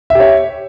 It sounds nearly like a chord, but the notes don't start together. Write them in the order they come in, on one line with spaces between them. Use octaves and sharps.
E5 G4 C#5